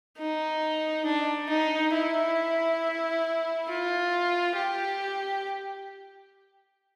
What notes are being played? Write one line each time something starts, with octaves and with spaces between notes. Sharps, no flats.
D#4
D4
D#4
E4
F4
G4